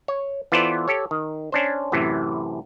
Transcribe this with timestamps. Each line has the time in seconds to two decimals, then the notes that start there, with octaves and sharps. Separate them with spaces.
0.08 C#5
0.52 E3 B3 F4 A4 C5 D5
0.88 G4 A4 C#5
1.11 D#3
1.52 C#4 D4 C5
1.92 F#2 A2 C3 E3